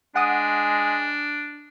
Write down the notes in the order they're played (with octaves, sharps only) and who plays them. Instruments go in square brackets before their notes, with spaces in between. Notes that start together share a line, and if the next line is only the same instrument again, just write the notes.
[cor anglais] G#3 [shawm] D4 [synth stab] F#5 D#6